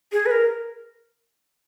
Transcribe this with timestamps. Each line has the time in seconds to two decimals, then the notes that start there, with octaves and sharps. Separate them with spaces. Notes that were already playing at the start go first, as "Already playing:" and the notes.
0.12 G#4
0.26 B4
0.31 A#4